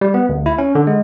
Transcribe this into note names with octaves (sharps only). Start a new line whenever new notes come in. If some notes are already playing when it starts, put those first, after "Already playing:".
G3
B3
D2
E4
C#4
D3
G#3